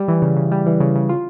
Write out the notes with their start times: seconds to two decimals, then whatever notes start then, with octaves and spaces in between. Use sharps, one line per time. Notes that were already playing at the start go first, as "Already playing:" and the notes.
Already playing: G3
0.08 E3
0.22 C#3
0.36 C#3
0.51 G3
0.66 E3
0.80 C#3
0.95 C#3
1.09 F4